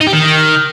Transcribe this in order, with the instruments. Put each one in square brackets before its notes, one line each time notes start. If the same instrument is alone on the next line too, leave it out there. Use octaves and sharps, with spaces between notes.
[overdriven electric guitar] D#4
G4
D#3